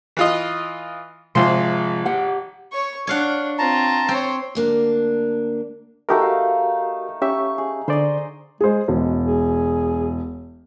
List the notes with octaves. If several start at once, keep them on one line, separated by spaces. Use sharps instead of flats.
E3 F4 D#5
G#1 C3 F3 G#3 C6
G4 F#5
C#5 C#6
D4 C#5 F5 F#5
C4 F4 A5 A#5
C4 C5 C#5
D2 A#3 D4
A3 D#4 F#4 G4 A4 A#4
F5
C#4 G4 E5 C#6
G#4
D3 C5 D5 D#5 C6
G#3 G#4 C5
E1 G#3
G#4